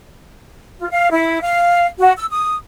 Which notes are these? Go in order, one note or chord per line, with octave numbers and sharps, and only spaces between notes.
F4
F5
E4
F5
F#4
E6
D#6